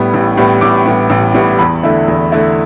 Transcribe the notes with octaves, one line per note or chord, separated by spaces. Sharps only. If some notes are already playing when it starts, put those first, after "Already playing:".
Already playing: A2 G3 B3
A1
A2 G3 B3
A1 D6
A2 G3 B3
A1
A2 G3 B3
E2 B5
D3 A3 E4
E2
D3 A3 E4